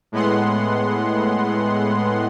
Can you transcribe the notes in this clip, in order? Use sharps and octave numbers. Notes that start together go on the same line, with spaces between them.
A2 G#3 B3 F#5 C6